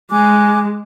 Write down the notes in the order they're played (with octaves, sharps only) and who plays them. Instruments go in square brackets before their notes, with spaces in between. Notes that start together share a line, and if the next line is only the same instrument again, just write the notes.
[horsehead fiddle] G#3 [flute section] G#5 D6 F#6